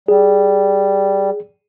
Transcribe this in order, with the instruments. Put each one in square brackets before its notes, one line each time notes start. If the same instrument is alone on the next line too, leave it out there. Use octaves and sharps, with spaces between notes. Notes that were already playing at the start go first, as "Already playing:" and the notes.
[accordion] G3 [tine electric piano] G#4